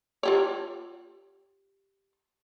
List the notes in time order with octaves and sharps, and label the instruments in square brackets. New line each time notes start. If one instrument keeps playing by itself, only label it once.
[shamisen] F4 G4 C#5